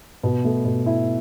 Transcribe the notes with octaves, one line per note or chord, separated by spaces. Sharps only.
B2
A3
B2
E4